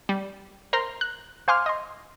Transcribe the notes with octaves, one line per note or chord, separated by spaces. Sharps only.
G3
A#4 C5 A#5 C6
F#6
C5 F5 G#5 C6 D6 F6
D#5 C6